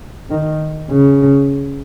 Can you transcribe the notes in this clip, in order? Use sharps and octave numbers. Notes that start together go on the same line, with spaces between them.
D#3
C#3